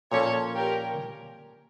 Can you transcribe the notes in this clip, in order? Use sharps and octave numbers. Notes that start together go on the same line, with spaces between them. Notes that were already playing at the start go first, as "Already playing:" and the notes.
A#2 F3 A#3 C#4 A4 C#5
G4 A#4